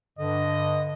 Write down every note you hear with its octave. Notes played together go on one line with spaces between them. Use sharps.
G2 D3 D#5